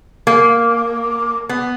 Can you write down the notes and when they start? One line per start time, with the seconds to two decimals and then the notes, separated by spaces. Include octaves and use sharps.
0.27 A#3
1.49 B3